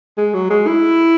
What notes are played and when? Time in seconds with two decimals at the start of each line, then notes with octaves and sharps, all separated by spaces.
0.18 G#3
0.34 F#3
0.50 G#3
0.67 E4